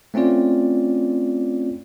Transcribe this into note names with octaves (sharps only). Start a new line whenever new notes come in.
A3 C4 C#4 F4 D5